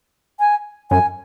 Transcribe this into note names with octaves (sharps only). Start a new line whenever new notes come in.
G#5
F#2 G#5